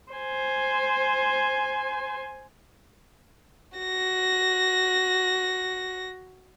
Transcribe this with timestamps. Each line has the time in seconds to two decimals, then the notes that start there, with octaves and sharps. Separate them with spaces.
0.13 C5 G#5
3.78 F#4 A#6